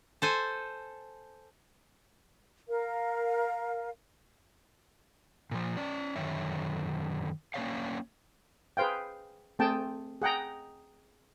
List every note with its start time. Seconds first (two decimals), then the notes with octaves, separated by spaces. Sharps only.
0.22 A4 C5 G#5
2.68 A#4 F5
5.51 A#2 F3
5.77 C#4 D5
6.16 F#2 D3 D#3 C#5 E5
7.54 A#3 C#4 D4 C#5 F5
8.77 G#4 B4 C5 F5 G5
9.59 A3 C4 G#4 G5 A5
10.22 G#4 F#5 G5 A#5